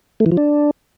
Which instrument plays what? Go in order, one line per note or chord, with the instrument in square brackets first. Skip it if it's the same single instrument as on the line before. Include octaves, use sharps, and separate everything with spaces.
[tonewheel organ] A3
E3
F3
D4